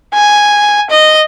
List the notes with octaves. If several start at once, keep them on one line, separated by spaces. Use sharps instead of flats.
G#5
D#5